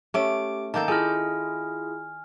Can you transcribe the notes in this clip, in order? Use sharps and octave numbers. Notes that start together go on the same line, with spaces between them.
A3 C#4 G4 D6 D7
D#3 A#3 A4 A5 D6 G6
E4 F4 G#4 A4 G#5 F6